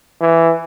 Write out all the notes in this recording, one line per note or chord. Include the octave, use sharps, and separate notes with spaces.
E3